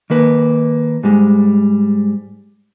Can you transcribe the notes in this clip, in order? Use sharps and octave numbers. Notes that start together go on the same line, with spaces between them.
D#3 A#3 B4
G#2 G3 G#3